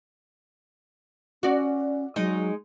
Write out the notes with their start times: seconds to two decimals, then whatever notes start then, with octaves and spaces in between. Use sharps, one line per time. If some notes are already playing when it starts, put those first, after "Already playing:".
1.43 C#4 F#4 D5
2.16 F#3 G#3 D#4